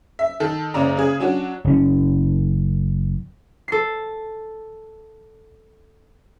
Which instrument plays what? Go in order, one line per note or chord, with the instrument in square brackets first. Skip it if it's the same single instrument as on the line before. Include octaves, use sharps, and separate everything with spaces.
[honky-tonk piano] E5
D#3 A4
F#1 C#3 C#4 D5 A#5
C#3 G#4
F#3 C#4 D4 F#4
[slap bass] F#1 C#4
[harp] A4 C7